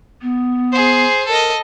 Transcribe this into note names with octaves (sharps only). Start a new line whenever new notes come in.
B3
G#4 C5
A4 A#4 D#5